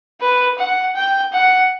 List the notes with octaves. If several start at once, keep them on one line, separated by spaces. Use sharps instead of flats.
B4
F#5
G5
F#5